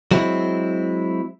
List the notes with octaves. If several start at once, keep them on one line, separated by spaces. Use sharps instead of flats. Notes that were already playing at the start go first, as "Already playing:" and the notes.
F#3 G#3 C4 E4